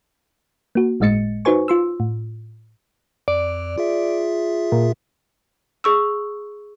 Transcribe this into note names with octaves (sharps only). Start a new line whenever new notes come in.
A#3 F#4
G1 A2 G#3 D#5 A6 C#7
D#4 F#4 B4 C5 G#5 C#6
F4 C6 E6
A2
F2 D5
F4 G#4 E5
A#2
G#4 C#6 E6